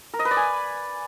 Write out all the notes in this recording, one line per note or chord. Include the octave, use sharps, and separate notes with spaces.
A#4
D#5
B4
D5
G#5